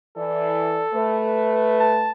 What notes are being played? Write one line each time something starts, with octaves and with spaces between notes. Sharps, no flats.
E3 A4 D5
A3 B4
A5